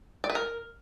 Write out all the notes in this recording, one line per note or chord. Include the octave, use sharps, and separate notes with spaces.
D5
B4
A#4